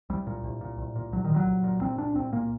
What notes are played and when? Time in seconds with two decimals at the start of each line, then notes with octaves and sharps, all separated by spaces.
0.10 C2 G3
0.27 A#2
0.44 C2
0.61 A#2
0.78 C2
0.96 A#2
1.12 C2 F#3
1.24 D#3
1.30 A#2
1.36 F#3
1.47 C2
1.64 A#2
1.81 C2 C4
1.98 A#2 D4
2.15 C2 C4
2.33 A#2 A#3